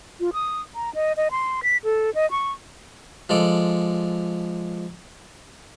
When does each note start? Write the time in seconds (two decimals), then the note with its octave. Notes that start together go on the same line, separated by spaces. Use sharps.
0.20 F4
0.33 D#6
0.75 A#5
0.95 D#5
1.17 D#5
1.31 C6
1.63 B6
1.84 A4
2.15 D#5
2.31 C#6
3.29 F3 G#3 A4 D5